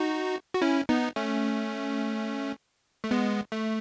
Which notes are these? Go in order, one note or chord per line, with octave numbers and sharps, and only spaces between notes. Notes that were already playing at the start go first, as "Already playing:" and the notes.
Already playing: D#4 F#4
F#4
C#4 E4
B3 D#4
A3 C#4
A3
G#3 B3
A3